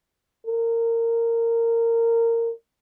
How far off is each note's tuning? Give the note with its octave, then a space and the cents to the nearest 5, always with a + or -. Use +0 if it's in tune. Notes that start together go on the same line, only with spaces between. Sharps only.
A#4 -20